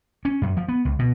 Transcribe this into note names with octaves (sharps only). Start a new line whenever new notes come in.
C#4
F#2
F3
B3
C#2
B2